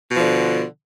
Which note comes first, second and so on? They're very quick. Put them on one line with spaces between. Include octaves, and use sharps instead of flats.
B2 F3 D3